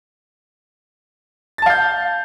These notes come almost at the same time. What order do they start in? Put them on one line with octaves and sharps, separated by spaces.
A6 A5 F5 G6